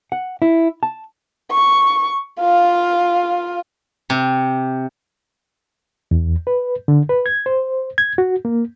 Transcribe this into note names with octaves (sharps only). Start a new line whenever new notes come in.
F#5
E4
A5
C#6
F4 F5
C3
E2
B4
D3
B4
G#6
C5
G#6
F#4
A#3